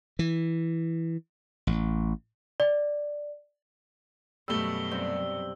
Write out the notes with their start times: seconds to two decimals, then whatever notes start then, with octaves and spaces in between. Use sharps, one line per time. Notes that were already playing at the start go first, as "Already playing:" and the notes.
0.19 E3
1.67 A1
2.60 D5
4.48 F#2 B2 G3 A3 E6 G7
4.91 G2 C3 C4